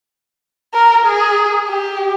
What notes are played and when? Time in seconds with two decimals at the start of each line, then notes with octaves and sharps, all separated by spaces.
0.74 A#4
1.06 G#4
1.69 G4